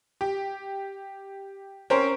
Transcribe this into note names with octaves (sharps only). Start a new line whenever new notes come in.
G4
C4 C#4 A#4 C5